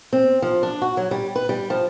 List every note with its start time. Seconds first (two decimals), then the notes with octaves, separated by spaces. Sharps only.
0.13 C4
0.42 F3
0.63 D4
0.82 F#4
0.97 F#3
1.11 G3
1.36 B4
1.49 G3
1.70 F3